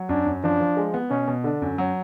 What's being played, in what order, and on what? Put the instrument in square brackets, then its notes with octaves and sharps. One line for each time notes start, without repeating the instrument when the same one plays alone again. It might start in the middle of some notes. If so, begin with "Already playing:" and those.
Already playing: [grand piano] F#3
[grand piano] F#2 [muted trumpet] D4
[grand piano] F#2
[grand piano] F3 [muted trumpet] D4
[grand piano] F3
G#3
B3
[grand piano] B2 [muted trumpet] C#4
[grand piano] B2
[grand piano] D3 [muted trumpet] D4
[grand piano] F#2
F#3